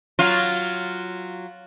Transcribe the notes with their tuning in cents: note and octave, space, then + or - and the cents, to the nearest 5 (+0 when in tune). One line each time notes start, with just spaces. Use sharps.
F#3 +0 F4 +0